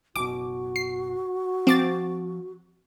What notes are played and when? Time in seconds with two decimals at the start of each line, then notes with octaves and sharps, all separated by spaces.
0.16 F#1 B2 F#4 D6
0.76 C7
1.67 F3 C4 D6 A6